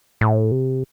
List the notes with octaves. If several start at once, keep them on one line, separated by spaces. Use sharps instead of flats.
A2
C3